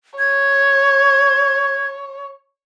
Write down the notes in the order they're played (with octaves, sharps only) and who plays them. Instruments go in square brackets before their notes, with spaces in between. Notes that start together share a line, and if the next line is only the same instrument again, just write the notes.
[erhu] C#5 [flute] G#6